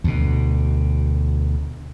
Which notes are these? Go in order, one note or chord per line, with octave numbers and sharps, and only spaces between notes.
D2 B2